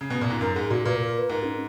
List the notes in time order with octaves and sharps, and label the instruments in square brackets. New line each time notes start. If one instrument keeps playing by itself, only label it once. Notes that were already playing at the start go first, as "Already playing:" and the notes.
[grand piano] C#3
B2
A#2
G#2
[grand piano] F#2 [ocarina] A#4
[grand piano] G#2 [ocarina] G#4
[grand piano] A#2 [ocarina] F#4
[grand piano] A#2 [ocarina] B4
[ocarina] A#4
A#4
B4
[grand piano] G#2 [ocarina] A#4
[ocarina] C#4